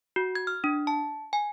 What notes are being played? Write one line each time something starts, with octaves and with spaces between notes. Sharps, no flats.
F#4
G#6
F6
D4
A5
G#5